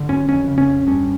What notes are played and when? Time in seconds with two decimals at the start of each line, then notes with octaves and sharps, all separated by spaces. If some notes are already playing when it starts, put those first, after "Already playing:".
Already playing: D3
0.09 F#2 C#4
0.28 F2 C#4
0.48 C#3
0.58 C#4
0.67 F2
0.87 G2 C#4